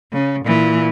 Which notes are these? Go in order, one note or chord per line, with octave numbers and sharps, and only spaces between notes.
C#3
A#2 E3